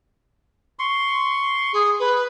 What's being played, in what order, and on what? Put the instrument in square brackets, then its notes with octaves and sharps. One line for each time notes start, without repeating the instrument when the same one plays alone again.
[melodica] C6 C#6
[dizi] G#4
B4